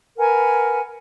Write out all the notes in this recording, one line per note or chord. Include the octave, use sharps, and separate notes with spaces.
A#4 B4 F#5 G#5